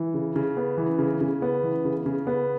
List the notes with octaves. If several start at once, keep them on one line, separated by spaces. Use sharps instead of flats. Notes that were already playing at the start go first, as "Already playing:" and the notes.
Already playing: E3
C#3
C#3
B3
E3
C#3
C#3
B3
E3
C#3
C#3
B3